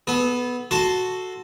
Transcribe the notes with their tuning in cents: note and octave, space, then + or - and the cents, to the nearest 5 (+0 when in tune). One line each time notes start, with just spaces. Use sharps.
B3 +0 A4 -35
F#4 +0 A4 +0 C6 +5